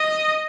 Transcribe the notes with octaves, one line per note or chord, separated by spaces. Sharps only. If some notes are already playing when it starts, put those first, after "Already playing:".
Already playing: D#5